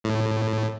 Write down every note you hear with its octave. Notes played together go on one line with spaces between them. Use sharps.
A2